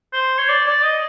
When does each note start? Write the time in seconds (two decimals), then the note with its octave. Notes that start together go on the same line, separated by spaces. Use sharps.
0.13 C5
0.38 C#5
0.49 D5
0.67 D5
0.83 D#5